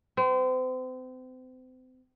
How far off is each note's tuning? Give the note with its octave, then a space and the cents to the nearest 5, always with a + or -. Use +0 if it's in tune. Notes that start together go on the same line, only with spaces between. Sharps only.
C4 -35